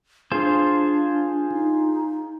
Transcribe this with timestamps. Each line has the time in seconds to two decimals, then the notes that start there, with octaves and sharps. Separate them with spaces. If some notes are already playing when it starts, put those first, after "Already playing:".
0.32 D4 F4 G#4 C5
1.52 D#4